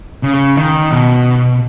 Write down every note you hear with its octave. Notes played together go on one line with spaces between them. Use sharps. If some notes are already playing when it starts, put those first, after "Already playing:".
C#3
D#3
B2